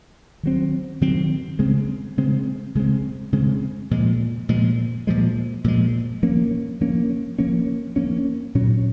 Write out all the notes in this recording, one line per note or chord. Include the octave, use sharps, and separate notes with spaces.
D#3 F#3 C4
D#3 F#3 C4
C#3 G#3 C4
C#3 G#3 C4
C#3 G#3 C4
C#3 G#3 C4
A#2 F3 G#3
A#2 F3 G#3
A#2 F3 G#3
A#2 F3 G#3
F3 A#3 C#4
F3 A#3 C#4
F3 A#3 C#4
F3 A#3 C#4
A#2 F#3 C#4